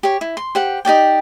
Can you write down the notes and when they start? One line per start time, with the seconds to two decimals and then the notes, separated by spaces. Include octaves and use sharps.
0.03 G4 C#5
0.21 E4
0.37 C6
0.55 G4 C5 F#5
0.85 D#4 G4 D5 G5